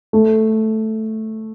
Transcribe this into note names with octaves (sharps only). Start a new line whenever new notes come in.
A3